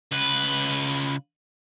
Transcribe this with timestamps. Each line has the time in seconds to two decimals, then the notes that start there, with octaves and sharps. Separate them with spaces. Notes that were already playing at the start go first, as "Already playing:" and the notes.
0.11 C#2 B4